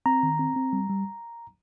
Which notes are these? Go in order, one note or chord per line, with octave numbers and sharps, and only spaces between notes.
C4 A#5
D#3
C4
C4
G3
G3